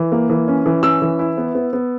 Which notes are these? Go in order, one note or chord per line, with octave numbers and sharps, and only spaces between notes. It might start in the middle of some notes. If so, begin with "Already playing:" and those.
Already playing: E3
A#3
E3
C#4
E3
C#4 E6
E3
E4
B3
B3
B3